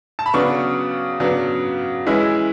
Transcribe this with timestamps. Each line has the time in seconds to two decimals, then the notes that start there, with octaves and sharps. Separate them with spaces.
0.19 A5
0.26 B5
0.33 C#3 F#3 B3 D4 C#6
1.20 C#3 F#3 B3 D4
2.06 E3 G#3 C#4 E4